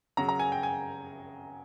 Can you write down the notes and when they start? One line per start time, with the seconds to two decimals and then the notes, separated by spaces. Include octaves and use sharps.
0.17 C#3 F#3 A#5
0.29 A#5
0.39 G#5
0.52 G5
0.63 G#5